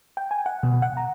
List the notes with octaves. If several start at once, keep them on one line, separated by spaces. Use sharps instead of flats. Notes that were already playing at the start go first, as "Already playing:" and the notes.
G5
G#5
F#5
B2
F#5
A#5